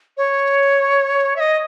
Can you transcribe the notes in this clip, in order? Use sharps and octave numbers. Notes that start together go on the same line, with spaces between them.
C#5
E5
D#5